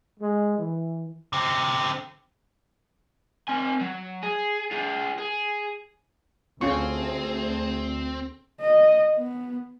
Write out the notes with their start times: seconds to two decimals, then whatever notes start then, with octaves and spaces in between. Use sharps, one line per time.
0.20 G#3
0.58 E3
1.33 D3 C4
3.48 C4 G#5
3.81 F#3
4.23 G#4
4.71 F4 G#4
5.19 G#4
6.61 D2 C4 C#4 F4 G#4 C#6
8.61 D#5
9.17 B3